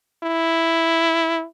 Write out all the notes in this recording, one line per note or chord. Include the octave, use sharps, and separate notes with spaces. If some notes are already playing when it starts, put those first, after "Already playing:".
E4